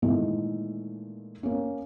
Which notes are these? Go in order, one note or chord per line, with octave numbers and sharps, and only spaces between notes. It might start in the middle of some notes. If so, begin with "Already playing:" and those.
A#2 D#3 E3 G#3 A3
A#3 C#4